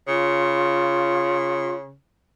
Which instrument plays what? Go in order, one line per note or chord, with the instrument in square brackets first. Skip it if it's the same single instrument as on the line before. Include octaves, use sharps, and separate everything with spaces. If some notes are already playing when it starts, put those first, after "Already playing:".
[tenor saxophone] C#3 [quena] F4